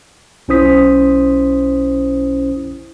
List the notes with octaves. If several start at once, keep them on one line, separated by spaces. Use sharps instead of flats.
B1 C#4 E4 C5 D#6 B6